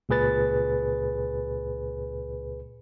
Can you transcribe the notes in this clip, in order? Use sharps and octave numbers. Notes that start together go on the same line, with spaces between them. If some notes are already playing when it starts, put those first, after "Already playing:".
C#2 A#2 G#4 B4 A6